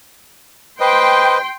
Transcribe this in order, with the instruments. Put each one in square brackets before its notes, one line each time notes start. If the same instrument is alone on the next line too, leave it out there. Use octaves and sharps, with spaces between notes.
[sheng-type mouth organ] B4 C5 D#5 [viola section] G5 C6